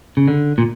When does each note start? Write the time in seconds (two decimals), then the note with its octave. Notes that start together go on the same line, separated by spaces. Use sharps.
0.17 C#3
0.28 D3
0.58 A#2